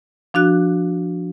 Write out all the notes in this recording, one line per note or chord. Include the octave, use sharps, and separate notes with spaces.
F3 D4 F#4 F#6